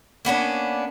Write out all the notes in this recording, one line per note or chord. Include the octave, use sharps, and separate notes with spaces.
A#3 B3 C#4 D4